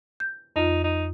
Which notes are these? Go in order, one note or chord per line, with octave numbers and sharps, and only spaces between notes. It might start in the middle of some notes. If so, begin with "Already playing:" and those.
G6
F2 D#4 F4
D#4